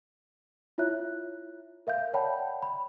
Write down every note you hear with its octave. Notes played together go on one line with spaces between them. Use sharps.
E4 F4 C#5 E5 F#6
A#4 E5 F5 G6
C#5 D5 F#5 G5 A5 B5
B5